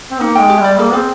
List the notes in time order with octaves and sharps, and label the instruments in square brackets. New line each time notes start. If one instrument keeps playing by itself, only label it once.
[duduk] C4
[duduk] A#3 [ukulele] D#4
[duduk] G#3 [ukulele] G5
[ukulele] G4
[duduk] G3 [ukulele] D5
[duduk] A#3 [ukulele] G#4
[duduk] C4 [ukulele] G#4